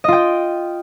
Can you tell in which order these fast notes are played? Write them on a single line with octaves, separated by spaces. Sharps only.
D#5 F4 G5